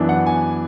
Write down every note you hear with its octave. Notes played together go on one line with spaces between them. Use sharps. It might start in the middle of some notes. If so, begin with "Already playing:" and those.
Already playing: F#2 E3 B3 D4
F#5
G#5